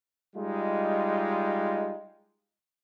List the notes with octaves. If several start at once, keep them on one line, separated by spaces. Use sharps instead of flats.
G3 G#3 D#4 F4